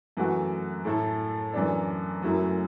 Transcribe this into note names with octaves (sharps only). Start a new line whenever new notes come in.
F#2 E3 A3 F#4
A2 A3 E4 A4
F#2 E3 D4
F#1 F#2 F#3 A3 E4